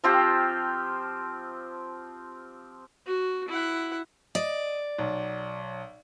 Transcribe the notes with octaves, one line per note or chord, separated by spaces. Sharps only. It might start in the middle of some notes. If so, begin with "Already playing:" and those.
F3 C4 F4 G4
F#4
E4 F#5
D5 D#5
B1